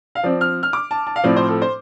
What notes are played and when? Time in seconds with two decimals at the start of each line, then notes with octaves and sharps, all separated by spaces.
0.15 F5
0.23 F3 C4 D5
0.41 F6
0.63 F6
0.73 D6
0.91 A5
1.07 A5
1.16 F5
1.24 A2 F3 C4 D5
1.36 C5
1.49 A4
1.62 C5